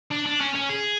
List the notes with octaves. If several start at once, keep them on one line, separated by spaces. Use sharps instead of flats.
D4
D4
C#4
C#4
G#4